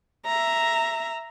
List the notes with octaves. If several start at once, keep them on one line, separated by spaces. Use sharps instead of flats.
E5 A#5